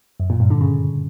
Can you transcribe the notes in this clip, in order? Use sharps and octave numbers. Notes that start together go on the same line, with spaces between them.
F#2
A#2
G2
D3
C#3